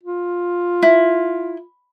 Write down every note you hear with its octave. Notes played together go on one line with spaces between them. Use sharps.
F4
E4